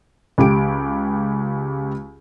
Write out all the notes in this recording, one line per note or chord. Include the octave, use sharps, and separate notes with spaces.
C#2 G4 D7